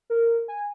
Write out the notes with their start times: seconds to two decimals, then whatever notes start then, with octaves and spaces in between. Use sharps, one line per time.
0.10 A#4
0.48 G#5